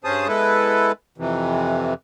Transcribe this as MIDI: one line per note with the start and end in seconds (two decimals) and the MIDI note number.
0.04 0.28 43
0.04 0.28 61
0.04 0.28 68
0.04 0.28 72
0.04 0.28 81
0.04 0.28 87
0.28 0.92 56
0.28 0.92 59
0.28 0.92 64
0.28 0.92 69
0.28 0.92 71
1.18 1.94 41
1.18 1.94 48
1.18 1.94 52